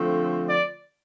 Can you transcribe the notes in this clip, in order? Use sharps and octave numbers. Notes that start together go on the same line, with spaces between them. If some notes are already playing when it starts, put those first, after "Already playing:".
Already playing: D3 F3 A3 C4
D5